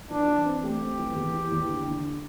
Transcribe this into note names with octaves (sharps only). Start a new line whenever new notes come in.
E3 D4
E3
C4
A3 G4
C4
E3
E2
E4
E2
D3
D3